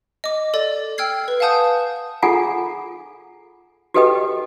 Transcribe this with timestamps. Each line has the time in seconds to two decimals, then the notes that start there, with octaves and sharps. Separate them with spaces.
0.24 D#5 D6
0.54 A4 D5 A6
0.98 G5 E6 F6 G#6 C7
1.28 B4
1.40 F5 F#5 G#5 A5 D#6 G6
2.22 F4 G#4 A4 F#5 G#5 A#5
3.94 F#4 G4 A4 B4 D#5 G5